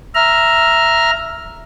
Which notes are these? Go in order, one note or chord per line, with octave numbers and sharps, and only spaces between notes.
E5 A#5 F6